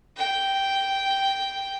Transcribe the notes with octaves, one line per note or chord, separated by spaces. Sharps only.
G5